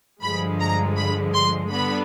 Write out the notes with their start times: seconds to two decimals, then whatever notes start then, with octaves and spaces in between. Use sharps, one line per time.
0.23 G2 D3 F3 G#3 B5
0.60 A#5
0.97 B5
1.34 C6
1.70 D3 G3 B3 B5